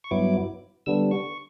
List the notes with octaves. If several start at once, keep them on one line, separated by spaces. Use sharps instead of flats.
C#6
G2 F#3 B3 E4 D6
D3 G3 B3 D4 E6
C#6